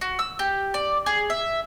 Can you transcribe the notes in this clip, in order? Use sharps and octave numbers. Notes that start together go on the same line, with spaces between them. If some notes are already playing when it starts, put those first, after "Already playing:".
F#4
E6
G4
D5
G#4
E5